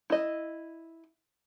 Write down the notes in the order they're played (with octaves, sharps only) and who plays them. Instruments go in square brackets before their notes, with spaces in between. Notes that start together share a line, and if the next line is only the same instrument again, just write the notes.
[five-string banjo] E4 D#5